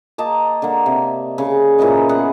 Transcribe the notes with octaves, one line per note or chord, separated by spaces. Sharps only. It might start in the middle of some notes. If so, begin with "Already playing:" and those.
A#3 D#5 A5 D6
D3 A#3
C3
C#3
A#2 E3 C#4 D#5
B3 G#4 F#5